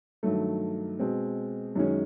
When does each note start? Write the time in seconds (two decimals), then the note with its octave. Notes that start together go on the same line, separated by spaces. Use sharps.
0.23 G2 D#3 F#3 A3
0.99 B2 G#3 C4
1.76 F#2 D#3 G#3 C#4